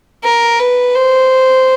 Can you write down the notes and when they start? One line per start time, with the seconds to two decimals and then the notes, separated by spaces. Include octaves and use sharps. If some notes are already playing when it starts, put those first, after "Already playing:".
0.25 A#4
0.60 B4
0.95 C5